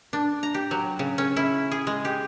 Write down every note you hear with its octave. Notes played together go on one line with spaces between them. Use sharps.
D4
A#5
G4
F#3
C#3
C#4
E4
G#4
G#3
G4